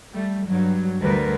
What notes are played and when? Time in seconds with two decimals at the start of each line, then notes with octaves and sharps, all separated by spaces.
0.12 G3 A3
0.48 G2 F#3
1.01 D2 G3 A#4 B4